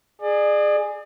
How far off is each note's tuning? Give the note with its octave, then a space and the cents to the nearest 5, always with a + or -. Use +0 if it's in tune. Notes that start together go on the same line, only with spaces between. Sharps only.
G#4 +0 D5 +35